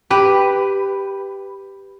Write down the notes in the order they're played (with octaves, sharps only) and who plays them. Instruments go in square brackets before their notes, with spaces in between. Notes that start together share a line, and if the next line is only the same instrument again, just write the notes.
[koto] G4 B4